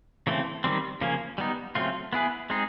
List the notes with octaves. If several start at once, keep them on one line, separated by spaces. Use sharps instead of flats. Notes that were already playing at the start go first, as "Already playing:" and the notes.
C#3 E3 A3 C4
D#3 G3 C4
C#3 F3 A#3 C#4
G3 B3 D#4
C#3 F#3 A3 C4 F4
B3 E4 G#4 B4
G#3 C4 D#4 G#4